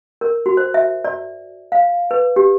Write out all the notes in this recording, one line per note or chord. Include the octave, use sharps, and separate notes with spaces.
A#4
F#4
C5
E5
D5
F5
B4
G4